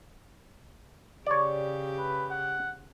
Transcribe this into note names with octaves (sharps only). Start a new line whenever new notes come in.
C#3 G4 C#5 D5
B4
F#5